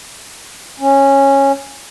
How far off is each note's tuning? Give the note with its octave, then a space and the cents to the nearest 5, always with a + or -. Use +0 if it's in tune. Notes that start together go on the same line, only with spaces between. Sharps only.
C#4 -10